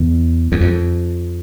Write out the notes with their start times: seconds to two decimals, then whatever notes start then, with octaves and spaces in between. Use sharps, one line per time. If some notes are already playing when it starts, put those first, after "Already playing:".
Already playing: E2
0.52 E2
0.61 F2